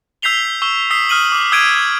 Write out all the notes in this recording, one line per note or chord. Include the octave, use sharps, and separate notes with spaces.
E6 G6 B6 C7 F7 G7
C#6 E6
D#6 E6 B6 C7
D#6 F6 D#7 F#7
D6
D#6 E6 G6 G#6 D7 D#7